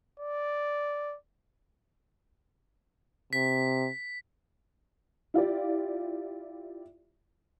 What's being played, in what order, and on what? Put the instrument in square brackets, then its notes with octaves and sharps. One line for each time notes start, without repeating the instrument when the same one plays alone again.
[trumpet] D5
[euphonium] C3 [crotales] B6
[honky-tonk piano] E4 F4 G4 D5